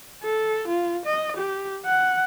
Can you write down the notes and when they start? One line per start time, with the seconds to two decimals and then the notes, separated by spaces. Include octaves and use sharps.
0.23 A4
0.68 F4
1.06 D#5
1.37 G4
1.85 F#5